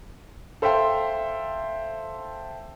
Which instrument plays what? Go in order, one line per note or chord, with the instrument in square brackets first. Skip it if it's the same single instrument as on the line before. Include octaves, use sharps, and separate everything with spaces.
[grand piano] A4 C5 E5 F5 G5 C6